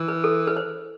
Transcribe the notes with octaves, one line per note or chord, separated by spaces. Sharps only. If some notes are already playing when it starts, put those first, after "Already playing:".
Already playing: E3
B4
A4
B4
C5